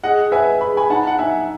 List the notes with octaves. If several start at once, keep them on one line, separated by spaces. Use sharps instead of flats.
G#4 D#5 F#5
B4 E5 G#5
G#4 B5
G#5 B5
D#4 F#5 A5
F#5
D#4 E5 G#5